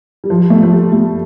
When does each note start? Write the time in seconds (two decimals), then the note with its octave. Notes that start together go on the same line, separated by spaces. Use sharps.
0.24 G3
0.30 F3
0.50 A3
0.63 F3
0.72 G3
0.92 A3